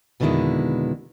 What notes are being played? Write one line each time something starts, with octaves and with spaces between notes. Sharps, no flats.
F2 B2 D3 D#3 G#3 E4